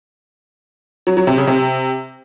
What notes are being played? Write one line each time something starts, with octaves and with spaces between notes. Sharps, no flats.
F#3
F#3
C3
C#3
C3